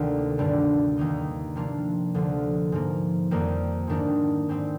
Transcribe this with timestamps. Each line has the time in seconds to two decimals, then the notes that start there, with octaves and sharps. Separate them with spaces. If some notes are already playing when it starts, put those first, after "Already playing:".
Already playing: D2 C3 D#3 A#3
0.38 G2 D3 G3 D4 F4
0.97 D#2 D#3 A#3 D#4
1.56 C3 F3 A#3 D4 F4
2.14 D2 D3 F3
2.72 G#2 F3 A#3
3.31 F2 D#3 G3 A#3
3.87 G#2 D#3 A#3 D4
4.49 G#2 G3 C4